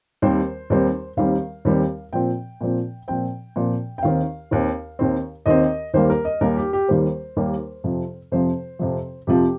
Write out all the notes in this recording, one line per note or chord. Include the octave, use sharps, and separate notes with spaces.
D#2 D#3 G3 C4 C5
D#2 D#3 G3 C4
D#2 D#3 G3 C4 F5
D#2 D#3 G3 C4
A#2 F3 C4 G5
A#2 F3 C4
A#2 F3 C4 G5
A#2 F3 C4
G5
D#2 D#3 C4 F5
D#2 D#3 C4
D#2 D#3 C4
D#2 D#3 C4 D#5
D#2 D#3 G3 A#3 C5
A#4
D#5
D#2 D#3 G3 A#3 A#4
G4
G4
D#2 D#3 G3 A#3 C5
D#2 D#3 G3 A#3
F2 C3 F3
F2 C3 F3 C5
F2 C3 F3
F2 C3 F3 G4